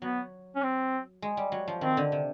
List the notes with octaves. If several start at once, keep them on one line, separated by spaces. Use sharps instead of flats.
F#3 B3
C#4
C4
G#3
G3
F#3
F3
D#3 C4
D3
C3